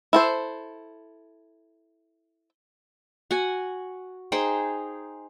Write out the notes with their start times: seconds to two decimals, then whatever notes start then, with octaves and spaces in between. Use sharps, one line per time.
0.13 E4 A4 C5
3.31 F#4 F#5 G#5
4.32 D#4 G#4 C5 G5